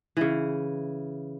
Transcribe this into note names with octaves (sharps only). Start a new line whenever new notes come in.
C#3 E3